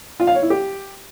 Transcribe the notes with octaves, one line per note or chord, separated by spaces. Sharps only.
F4
F5
C#5
E4
G4